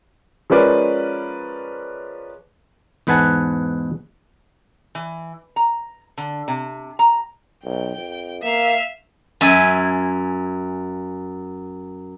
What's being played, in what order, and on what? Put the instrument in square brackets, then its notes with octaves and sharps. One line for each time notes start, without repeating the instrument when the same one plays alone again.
[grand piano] F3 G#3 C#4 A#4 B4 D5
[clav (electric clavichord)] E2 G#2 B4 F#5 G#5 A5
[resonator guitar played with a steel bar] E3
A#5
D3
C3
A#5
[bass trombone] B1 [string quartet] G5
[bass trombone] F2
[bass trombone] A#3 [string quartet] E5 F5
[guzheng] F#2 E5 G#5